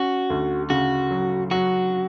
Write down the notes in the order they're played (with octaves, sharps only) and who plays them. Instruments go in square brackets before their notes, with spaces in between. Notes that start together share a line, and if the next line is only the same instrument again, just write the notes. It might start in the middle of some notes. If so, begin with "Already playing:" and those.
Already playing: [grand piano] C#4 [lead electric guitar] F#4
[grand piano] D2
[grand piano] C#3 [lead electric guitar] F#4
[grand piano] F#3
[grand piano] F#3 [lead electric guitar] F#4